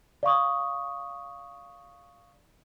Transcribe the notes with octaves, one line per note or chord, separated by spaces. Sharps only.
D5 F5 C#6 D#6